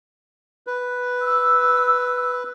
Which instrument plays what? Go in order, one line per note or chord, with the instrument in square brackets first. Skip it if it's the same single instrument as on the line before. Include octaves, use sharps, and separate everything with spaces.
[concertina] B4
[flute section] E6